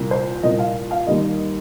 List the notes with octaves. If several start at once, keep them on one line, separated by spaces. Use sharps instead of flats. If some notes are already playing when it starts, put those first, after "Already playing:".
Already playing: C2 A#2 A#3
C5
C2 A#2 A#3 D#5
F5
F5
D#2 D#3 G3 A#3 D#5